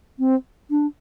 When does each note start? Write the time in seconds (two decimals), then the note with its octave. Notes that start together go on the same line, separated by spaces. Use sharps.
0.19 C4
0.71 D4